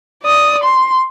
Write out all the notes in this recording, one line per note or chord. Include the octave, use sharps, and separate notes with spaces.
D5 D#6
C6